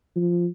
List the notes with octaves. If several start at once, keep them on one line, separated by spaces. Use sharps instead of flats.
F3